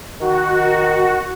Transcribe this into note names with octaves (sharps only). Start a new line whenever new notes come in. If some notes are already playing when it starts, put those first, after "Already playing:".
D#3 F#4